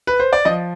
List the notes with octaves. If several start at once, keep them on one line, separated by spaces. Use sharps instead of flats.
B4
C5
D5
F3 D#5